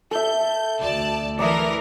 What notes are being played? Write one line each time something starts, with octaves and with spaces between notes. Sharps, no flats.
A4 E5 G6
D2 D5 A5
E3 A#4 D5 A#5 D#6